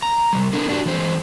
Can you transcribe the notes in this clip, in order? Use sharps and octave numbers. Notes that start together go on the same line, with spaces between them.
A#5
C3 G3
B3 D4 A4 A#4
D4 F#4 G4
E3 G#3 C4 C5